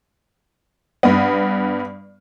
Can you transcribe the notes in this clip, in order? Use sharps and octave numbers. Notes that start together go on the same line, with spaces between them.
G2 B3